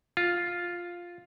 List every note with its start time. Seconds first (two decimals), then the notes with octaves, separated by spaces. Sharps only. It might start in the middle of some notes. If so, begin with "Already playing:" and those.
0.17 F4